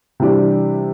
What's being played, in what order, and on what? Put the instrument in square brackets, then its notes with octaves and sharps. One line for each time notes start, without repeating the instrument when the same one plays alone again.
[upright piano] C3 E3 G3 D4 G4